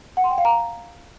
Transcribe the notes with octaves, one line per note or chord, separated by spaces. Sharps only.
F#5
C6
G5
F5
A#5